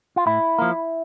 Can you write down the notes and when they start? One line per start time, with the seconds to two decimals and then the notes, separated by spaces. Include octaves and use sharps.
0.16 F4
0.26 A2 E4
0.59 F3 A#3